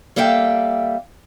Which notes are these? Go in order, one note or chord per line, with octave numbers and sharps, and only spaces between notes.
G3 A#3 A4 E5 F5 G5